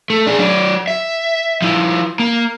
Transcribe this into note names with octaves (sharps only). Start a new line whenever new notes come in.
A3
D4 G#4
F#3 D5
E5
F3 E4
A#3